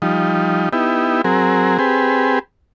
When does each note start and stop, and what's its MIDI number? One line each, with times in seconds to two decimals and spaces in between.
0.02 0.69 53
0.02 0.69 55
0.02 0.69 63
0.73 1.22 59
0.73 1.22 63
0.73 1.22 64
0.73 1.22 67
1.24 1.78 54
1.24 1.78 60
1.24 1.78 68
1.24 1.78 70
1.79 2.39 60
1.79 2.39 67
1.79 2.39 68
1.79 2.39 71